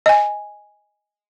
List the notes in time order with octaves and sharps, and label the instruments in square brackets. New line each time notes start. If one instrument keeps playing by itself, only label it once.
[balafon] D#5 G#5